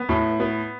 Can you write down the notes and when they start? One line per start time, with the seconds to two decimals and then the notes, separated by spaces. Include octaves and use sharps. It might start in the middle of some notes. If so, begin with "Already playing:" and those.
Already playing: B3
0.09 A2
0.40 B3